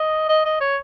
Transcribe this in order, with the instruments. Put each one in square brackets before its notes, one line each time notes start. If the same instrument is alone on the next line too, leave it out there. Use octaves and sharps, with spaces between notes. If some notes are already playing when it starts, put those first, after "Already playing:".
Already playing: [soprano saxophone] D#5
D#5
D#5
C#5